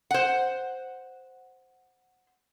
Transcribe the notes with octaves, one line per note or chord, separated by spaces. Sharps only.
C5 F#5